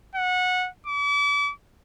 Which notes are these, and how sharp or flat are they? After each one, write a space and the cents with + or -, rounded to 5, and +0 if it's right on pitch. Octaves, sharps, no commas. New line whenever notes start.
F#5 -20
D6 -40